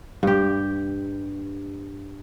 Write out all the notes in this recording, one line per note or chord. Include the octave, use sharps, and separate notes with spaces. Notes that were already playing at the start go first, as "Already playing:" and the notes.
G2 G4